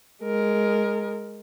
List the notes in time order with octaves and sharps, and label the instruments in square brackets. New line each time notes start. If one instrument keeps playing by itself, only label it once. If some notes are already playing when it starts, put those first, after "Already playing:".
[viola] G#3 A#4